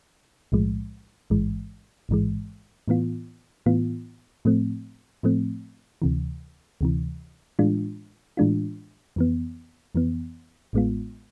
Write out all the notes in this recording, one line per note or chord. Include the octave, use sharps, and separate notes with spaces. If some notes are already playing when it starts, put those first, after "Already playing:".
B1 A2 F3 G#3
A1 G#2 E3 G#3
A1 G#2 E3 G#3
A2 E3 B3 F4
A2 E3 B3 F4
A2 F3 A3 C4
A2 F3 A3 C4
D2 C3 E3
D2 C3 E3
A2 E3 G#3 D4 F4
A2 E3 G#3 D4 F4
F2 E3 B3
F2 E3 B3
A1 A2 G#3 B3 F4